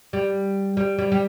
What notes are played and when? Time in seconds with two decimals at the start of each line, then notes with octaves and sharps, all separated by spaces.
0.13 G3
0.77 G3
0.98 G3
1.12 G3